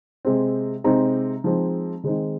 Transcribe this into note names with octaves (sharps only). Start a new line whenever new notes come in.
C3 G#3 C4
C3 G#3 C4 D#4 A#5
F3 G#3 C4 D#4
D#3 G#3 C4 D#4